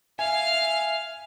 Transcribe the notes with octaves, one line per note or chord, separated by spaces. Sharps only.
E5 F5 G#5 F6